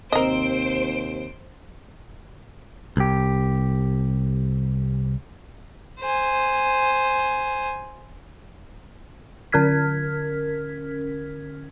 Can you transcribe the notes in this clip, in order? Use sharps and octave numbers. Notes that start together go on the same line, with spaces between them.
D#2 C3 C4 A#4 C5 D#5 D7
C2 G4
C5 G#5
D3 C#4 A#4 F6 G#6 B6